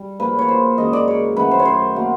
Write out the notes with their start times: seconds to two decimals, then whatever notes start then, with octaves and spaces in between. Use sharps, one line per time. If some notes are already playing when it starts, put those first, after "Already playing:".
Already playing: G3
0.20 A#2 F3 A#3 B4
0.39 C#5
0.49 C5
0.78 F#2 D#3 G#3 D#5
0.93 D5
1.08 C#5
1.36 F#2 D#3 F#3 A3 B4
1.51 C5
1.59 C#5
1.65 C5
1.95 B2 F#3 A#3